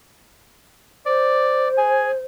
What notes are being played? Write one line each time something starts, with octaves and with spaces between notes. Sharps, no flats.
C5 D5
G#4 G#5